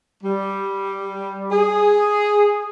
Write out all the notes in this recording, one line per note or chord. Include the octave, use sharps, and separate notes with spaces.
G3
G#4